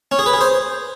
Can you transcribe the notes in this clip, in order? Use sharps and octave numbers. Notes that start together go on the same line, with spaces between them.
C#4
G#4
B4
G#4
C5